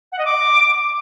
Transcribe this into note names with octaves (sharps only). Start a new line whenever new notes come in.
F#5
D#5
D6